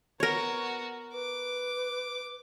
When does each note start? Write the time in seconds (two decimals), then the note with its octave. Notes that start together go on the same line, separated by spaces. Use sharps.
0.20 B3 F#4 A#4 C#5
1.13 B4 D6